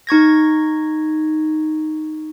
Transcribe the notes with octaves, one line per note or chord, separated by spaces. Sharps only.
D#4 C#6 G#6 A#6